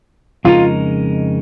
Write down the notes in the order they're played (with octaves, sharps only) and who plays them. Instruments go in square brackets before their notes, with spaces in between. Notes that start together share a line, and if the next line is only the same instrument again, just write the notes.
[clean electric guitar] F2 C#3 G#3 D#4 A#4 [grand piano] F4